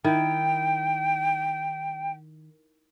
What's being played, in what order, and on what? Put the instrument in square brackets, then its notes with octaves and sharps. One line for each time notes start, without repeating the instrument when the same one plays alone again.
[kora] D#3 E4 [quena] G5